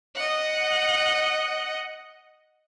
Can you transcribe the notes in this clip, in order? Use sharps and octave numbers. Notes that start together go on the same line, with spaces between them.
D#5 F#5